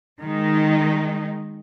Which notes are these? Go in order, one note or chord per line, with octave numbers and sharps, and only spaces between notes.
D#3 G#3 D#4